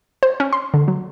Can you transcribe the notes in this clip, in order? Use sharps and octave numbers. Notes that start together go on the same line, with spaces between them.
C5
C#4
C6
D3
F#3